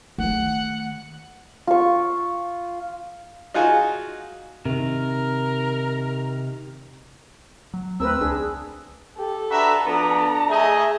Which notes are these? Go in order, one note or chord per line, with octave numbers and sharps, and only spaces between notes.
D#3 A3 F#5
F4 C#6
D#4 F4 F#4 G#4
C3 D#3 A#4
F#3
D#2 A3 C4 A#4 B4 E6
C#2 D4 G#4
G4 A4
D4 F#4 B4 E5 A#5
F3 B3 D4 D5 A#5
A3 G#4 D#5 E5